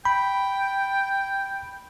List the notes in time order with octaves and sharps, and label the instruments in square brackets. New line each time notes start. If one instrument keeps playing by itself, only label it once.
[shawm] G5 [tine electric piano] B5